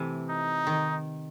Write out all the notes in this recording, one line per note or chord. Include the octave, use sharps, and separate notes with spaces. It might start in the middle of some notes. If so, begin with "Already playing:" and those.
Already playing: C3 E3 A3
D#4
D#3